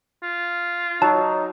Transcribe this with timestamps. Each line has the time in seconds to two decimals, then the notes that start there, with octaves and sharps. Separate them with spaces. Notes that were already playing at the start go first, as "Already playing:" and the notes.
0.23 F4
1.02 F#3 D#4 A5